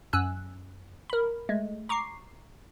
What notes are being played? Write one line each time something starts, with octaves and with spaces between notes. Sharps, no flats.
F#2 G#5 E6 F#6
A#4 B5
G#3 A3
A#5 C#6 D6 C7